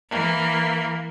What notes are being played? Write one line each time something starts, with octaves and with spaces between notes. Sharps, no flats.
E3 A#3